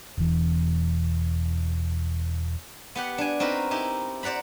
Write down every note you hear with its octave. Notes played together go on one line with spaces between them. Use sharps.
E1 E3
B3 G4 F#5
D4 G#5
C4 D#4 F#4 A#4 B4
D#4 E4 G4
C5 D5 F#5 A#5 B5